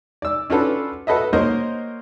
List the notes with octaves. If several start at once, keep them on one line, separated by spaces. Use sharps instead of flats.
D5 E6
C#4 D4 F4 F#4 A4 B4
F#4 A4 B4 D#5 E5
A#3 F#4 A#4 C5 C#5 D#5